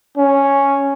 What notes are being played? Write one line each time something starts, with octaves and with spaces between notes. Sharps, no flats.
C#4